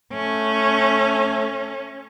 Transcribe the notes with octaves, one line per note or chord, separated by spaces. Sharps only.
A3 C#4